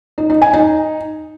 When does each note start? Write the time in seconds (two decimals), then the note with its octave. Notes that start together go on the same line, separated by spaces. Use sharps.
0.18 D#4
0.30 D#4
0.42 G#5
0.53 D#4